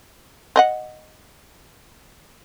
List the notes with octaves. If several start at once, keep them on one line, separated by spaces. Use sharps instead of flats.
C4 D#5 F#5